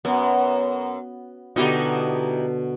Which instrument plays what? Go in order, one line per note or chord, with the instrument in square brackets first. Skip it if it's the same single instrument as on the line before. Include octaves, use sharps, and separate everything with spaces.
[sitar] F#2 [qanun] B3
[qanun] B2 D3 [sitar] D#4 E4 G4